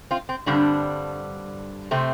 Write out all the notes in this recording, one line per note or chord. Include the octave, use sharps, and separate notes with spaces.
C4 F4
C4
G2 D3 G3 C4 D4
C3 A3 C4